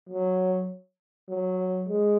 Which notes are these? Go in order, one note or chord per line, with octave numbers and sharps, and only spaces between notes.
F#3
F#3
G#3